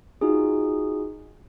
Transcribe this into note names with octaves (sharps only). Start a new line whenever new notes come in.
D#4 F4 F#4 G#4